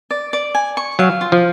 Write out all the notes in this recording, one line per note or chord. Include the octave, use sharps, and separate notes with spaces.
D5
D5
G#5
C#6
F#3 F5
F4
F3